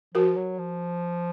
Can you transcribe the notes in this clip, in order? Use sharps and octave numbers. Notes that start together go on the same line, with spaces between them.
F3 F#4 A#4
F#3
F3